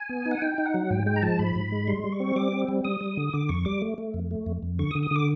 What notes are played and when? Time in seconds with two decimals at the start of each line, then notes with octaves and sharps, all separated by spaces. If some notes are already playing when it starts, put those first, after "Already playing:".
Already playing: G#5
0.09 B3
0.26 D#4
0.31 F#5
0.42 D#4 G5
0.58 D#4
0.66 F#5
0.74 F#3
0.90 G#2 G5
1.06 G#3 G5
1.16 A#5
1.22 F3 A5
1.39 G#2 B5
1.56 G#2
1.72 G#3
1.87 G3 C6
2.04 G3
2.12 C#6
2.20 C4
2.36 G3 D6
2.52 C4
2.68 G3
2.84 G3 D#6
3.01 G3
3.17 D3
3.33 D3 D6
3.49 F2 C#6
3.65 G3 D6
3.82 A3
3.98 A3
4.14 F2
4.31 A3
4.46 F2
4.63 F2
4.79 D3 C#6
4.91 D#6
4.95 D3
5.03 D#6
5.11 D3 D6